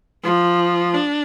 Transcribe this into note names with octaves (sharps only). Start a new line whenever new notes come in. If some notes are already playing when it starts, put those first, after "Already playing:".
F3
D4